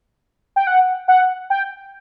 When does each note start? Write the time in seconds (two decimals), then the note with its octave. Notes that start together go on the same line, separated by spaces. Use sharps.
0.56 G5
0.67 F#5
1.08 F#5
1.50 G5